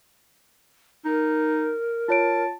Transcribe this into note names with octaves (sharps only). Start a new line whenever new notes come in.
D#4 A#4
F4 C#5 A5 D7